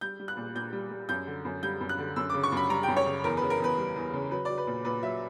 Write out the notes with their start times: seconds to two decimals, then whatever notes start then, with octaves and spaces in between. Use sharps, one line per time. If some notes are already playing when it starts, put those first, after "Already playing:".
0.01 G3 G6
0.20 G3
0.28 F#6
0.37 A#2
0.55 A#2 G6
0.73 G3
0.91 G3
1.09 F#2 G6
1.27 D3
1.45 F#2
1.63 G3 G6
1.81 F#2
1.89 F#6
1.98 D3
2.16 F#2 E6
2.30 D6
2.34 C#3
2.43 C#6
2.52 F#2 B5
2.70 G3 A#5
2.83 G5
2.88 F#2
2.97 C#5
3.06 C#3
3.24 E2 A#4
3.37 B4
3.42 C#3
3.50 A#4
3.60 E2 B4
3.78 G3
3.96 E2
4.13 C#3
4.31 F#3 B4
4.45 F#3 D5
4.58 B4
4.67 A#2
4.85 A#2 B4
5.03 F#3 E5